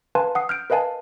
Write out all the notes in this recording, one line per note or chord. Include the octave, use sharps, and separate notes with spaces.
B4 F5 G#5 A5 C6
F#5 D#6 C7
F6 G6 D7
A#4 B4 D#5 F5 G#5 A5